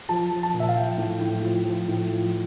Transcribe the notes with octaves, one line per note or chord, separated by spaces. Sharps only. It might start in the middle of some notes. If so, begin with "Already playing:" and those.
F3 A5
F3
A5
A#2
E5
F5
F3 G5
A2
A2
F3
F3
A2
F3